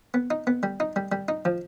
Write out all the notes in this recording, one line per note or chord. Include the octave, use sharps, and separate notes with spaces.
B3
D#4
B3
G3
D#4
G3
G3
D#4
F3